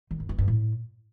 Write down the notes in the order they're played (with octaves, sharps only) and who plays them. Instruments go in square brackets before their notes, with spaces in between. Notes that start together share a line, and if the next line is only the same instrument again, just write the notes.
[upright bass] D#3
F#2
B3
G2
A2